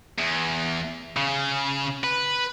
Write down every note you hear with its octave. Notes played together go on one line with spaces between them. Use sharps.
E2
C#3
B4